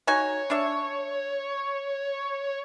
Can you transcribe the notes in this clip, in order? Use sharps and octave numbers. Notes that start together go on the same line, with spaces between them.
D#4 F#4 C#5 G#5
D4 D5 E5